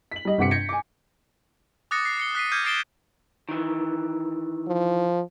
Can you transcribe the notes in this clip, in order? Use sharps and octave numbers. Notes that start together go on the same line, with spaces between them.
B6 F#7
G3 D#5
G1 C3 F#5 D6 B6 C#7
G6 G#6 A#6 C#7
G#5 D6
D6 D#6 F#6 A6 A#6 C#7
C7
C7 C#7 G7
F#6 B6 C7 D#7
D6 F6 G6 G#6 C#7 D#7
D#6 A6 C7 D7 E7 G7
D#3 E3
F3